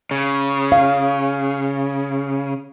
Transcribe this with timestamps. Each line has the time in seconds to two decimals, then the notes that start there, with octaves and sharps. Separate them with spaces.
0.11 C#3
0.72 F5